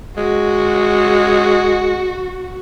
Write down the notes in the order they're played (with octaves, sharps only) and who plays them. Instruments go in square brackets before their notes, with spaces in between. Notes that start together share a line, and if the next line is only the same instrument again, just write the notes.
[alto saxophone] G#3 [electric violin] F#4